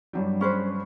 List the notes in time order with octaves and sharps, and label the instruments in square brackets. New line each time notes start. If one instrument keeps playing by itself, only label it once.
[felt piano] G2 F#3 G3
[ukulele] C#4 B4 C5